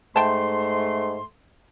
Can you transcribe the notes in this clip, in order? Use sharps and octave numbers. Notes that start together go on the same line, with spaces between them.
G#2 A3 G5 A5 C6